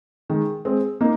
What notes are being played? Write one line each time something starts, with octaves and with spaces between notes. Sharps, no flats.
D#3 G#3
G#3 C4
A#3 D#4